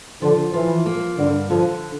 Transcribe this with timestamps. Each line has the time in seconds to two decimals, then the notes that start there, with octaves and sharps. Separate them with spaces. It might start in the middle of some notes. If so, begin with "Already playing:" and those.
0.22 D3 F3
0.53 E3 F3
0.86 A#3
1.18 G2 D3
1.50 D3 F3